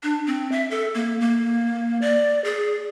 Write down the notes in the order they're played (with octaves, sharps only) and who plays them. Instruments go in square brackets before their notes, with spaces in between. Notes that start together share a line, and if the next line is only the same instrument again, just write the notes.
[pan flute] D4
C4
E5
A4
A#3
A#3
D5
G#4